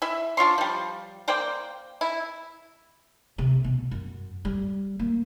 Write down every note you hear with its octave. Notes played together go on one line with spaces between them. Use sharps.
E4 E5
D4 F4 C#5 C6
F3 G3
A#3 C5 D5 G5
E4
C3
B2
F#2
G3
A#3